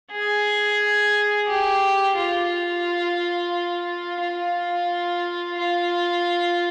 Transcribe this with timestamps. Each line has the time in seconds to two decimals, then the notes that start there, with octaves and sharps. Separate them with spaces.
0.12 G#4
1.47 G4
2.16 F4
4.21 F4
5.57 F4